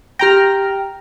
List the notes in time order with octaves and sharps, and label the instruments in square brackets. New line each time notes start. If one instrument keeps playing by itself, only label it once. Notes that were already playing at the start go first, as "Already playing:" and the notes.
[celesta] G4 A#6 [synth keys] G5 A#5 F6